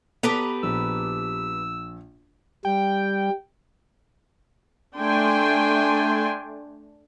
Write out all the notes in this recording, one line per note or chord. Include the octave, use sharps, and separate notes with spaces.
B3 G4 A4 B4 A#5
A#1 E6
G3 G5
A3 D4 G5 G#5 C6